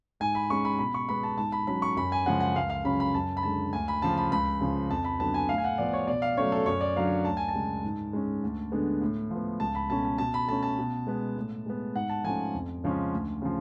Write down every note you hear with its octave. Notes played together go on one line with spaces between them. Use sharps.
G#2 G#5
B5
G#3 C#4 C#6
B5
B2 B5
C#6
G#3 B3 B5
A5
G#2 A5
B5
F#3 C#4 B5
C#6
F#2 B5
G#5
C#3 F3 G#3 F#5
F#5
C#2 F5
F5
C#3 F#3 C#4 B5
B5
F#2 A5
B5
D3 G#3 A5
D2 G#5
B5
C#3 F3 A5
B5
C#2 B5
C#3 F3
F2 A5
B5
D3 F#3 B3 A5
G#5
A2 F5
G#5
F#5
F3 B3 D5
C#5
B2 D5
F5
F#3 A3 C#4 C#5
A4
F#2 C#5
D5
D3 F#3 F5
D2 A5
G#5
A5
C#3 G#3
G#2
G#3 C#4
D2
D3 G#3 B3
A2
F3 B3
C#2 A5
B5
B2 A3 C#4 A5
A5
B2 A5
B5
A3 C#4 A5
A5
B2
G#3 B3
A2
G#3 B3
G#2 F#5
A5
F3 A3 C#4 G#5
F2
C#3 F3 G#3 C#4
D2
C#3 F3